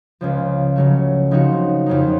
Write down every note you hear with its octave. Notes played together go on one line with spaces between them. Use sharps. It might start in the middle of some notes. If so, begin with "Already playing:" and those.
C#2 C#3 F3
C#3 F#3 A3
C#3 F3 C4 D#4 F#4
F2 C#3 F#3 A#3 D#4